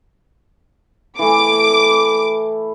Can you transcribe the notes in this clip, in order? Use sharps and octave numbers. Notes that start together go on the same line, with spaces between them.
E3 A3 D6